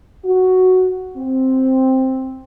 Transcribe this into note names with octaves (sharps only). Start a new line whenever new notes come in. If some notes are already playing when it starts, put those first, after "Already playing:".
F#4
C4